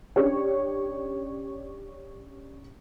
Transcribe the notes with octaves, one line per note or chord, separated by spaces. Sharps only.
C#4 D4 G4 C#5